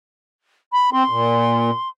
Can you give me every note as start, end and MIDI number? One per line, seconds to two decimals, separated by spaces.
0.73 0.90 83
0.93 1.03 60
0.93 1.89 84
1.10 1.70 46